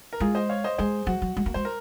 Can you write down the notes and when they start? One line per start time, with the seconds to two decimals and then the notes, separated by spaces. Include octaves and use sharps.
0.13 A#4
0.20 G#3 F4 G#4
0.35 C5 D#5
0.49 C#5 F5
0.64 C5 D#5
0.78 G#3 G#4 C5
1.07 F#3 F#4
1.22 F#3
1.37 G#3
1.46 A#3
1.54 G#3 C5
1.65 A#4